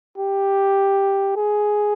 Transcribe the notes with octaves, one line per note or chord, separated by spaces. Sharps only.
G4
G#4